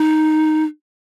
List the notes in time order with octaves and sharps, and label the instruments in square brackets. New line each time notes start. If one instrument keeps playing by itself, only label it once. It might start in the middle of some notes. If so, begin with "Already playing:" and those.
Already playing: [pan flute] D#4